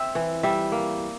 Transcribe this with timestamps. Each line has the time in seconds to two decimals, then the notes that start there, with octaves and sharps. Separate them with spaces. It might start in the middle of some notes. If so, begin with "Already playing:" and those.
Already playing: C4 E5
0.15 E3
0.43 G3 E5
0.72 A#3